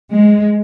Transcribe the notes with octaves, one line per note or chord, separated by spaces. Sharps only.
G#3